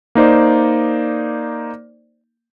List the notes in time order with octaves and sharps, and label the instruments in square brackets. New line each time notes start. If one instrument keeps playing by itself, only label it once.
[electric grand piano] A#3 D#4 C5 D5